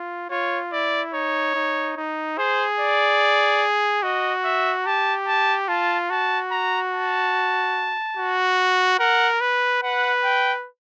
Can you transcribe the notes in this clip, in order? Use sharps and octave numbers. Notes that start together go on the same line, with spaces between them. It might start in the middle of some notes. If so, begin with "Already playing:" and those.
Already playing: F4
F4 C#5
E4 D5
D#4 C#5
D#4
D#4
G#4 C5
D5
F#4 D#5
E5
G4 A5
A5
F4 A5
F#4 A5
A#5
A5
F#4
A#4 F#5
B4
B4 F#5
G5